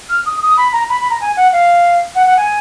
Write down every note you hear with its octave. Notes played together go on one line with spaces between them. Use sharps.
F6
D#6
D#6
B5
A#5
B5
B5
A#5
G#5
F#5
F5
F#5
F#5
G#5